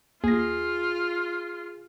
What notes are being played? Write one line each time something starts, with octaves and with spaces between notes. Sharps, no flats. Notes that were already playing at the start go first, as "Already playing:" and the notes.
D#2 F4 G#4 A#6